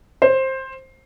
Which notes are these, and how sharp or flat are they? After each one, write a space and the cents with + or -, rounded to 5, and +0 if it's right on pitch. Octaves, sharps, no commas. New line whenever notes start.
C5 +15